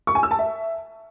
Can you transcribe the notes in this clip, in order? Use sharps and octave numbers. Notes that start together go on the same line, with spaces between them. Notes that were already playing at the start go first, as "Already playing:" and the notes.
C#6
G#5
E6
A5
E5